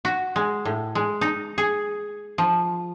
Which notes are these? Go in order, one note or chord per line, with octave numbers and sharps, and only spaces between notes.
F#4
G#3
A2
G#3
D#4
G#4
F3